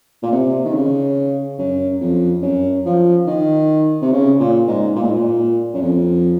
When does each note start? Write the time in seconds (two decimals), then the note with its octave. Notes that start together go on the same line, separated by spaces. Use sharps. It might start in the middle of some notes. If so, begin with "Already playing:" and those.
0.23 A#2
0.32 C3
0.65 D#3
0.74 C#3
1.59 F#2
2.01 F2
2.42 F#2
2.86 F3
3.27 D#3
4.02 C3
4.12 C#3
4.39 A#2
4.67 G#2
4.96 A#2
5.04 G#2
5.12 A#2
5.74 F#2
5.81 F2